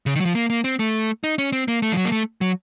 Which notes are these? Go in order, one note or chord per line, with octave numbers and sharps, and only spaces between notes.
C#3
D#3
F#3
F3
A#3
A#3
C4
A3
D#4
C#4
C4
A#3
A3
F3
F#3
A#3
A3
F#3